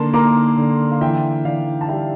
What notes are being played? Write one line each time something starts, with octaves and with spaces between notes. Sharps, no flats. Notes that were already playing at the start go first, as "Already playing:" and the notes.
Already playing: D3 A#3 A5 C6
A#3 A#5 D6
D3
F5
E3 E5 G5
E3 D5 F5
A5
G3 E5 G5